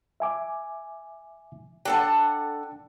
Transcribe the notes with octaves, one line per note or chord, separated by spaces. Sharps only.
E5 G#5 D6
D4 A4 F#5 G5